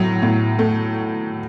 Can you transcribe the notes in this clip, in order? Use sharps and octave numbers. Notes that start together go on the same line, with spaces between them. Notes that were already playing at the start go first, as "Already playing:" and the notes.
Already playing: A2 F#3
A2
A3